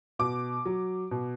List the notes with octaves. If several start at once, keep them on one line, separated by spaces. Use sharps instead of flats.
B2 D6
F#3
B2